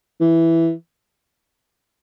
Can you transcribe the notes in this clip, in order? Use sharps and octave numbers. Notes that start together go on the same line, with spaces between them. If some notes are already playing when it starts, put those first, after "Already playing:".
E3